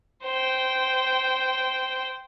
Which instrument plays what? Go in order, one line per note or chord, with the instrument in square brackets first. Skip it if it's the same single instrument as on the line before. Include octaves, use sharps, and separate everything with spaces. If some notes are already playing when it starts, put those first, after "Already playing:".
[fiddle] C5 G5